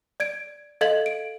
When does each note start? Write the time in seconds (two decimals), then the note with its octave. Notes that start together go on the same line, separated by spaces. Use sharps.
0.20 D5 G#6 D7
0.81 A4 D#5 F5 G#6 F#7
1.06 D7